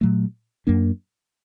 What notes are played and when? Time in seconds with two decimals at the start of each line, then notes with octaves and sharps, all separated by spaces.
0.01 A#2 F#3 A3
0.67 F#2 F#3 A#3 D4